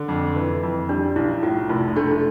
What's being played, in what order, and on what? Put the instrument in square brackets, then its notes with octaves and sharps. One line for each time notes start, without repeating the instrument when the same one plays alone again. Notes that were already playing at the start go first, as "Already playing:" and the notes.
Already playing: [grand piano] D3
F2
E3
F2
[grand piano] G3 [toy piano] D4
[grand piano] B1 [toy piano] E4
[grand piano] A2 [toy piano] F4
[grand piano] F1
[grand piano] A3 [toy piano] D4